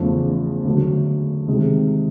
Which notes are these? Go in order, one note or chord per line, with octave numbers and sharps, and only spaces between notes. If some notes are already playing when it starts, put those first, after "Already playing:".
Already playing: E2 C#3 F3 A3
D3 F#3 A3 D4
C3 D#3 G#3